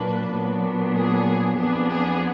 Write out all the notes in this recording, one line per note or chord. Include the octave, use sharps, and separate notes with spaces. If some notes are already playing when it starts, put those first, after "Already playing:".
Already playing: A#2 F#3 A#3 D4 B4
A#2 F#3 B3 D4
G#4
F2 F3 B3 D4 G#4
G#4